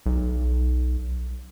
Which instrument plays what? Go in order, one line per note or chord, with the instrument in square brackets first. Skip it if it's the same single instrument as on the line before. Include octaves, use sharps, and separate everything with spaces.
[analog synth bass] B1